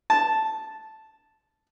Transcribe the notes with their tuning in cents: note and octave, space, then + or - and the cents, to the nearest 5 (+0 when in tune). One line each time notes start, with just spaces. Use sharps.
A5 -5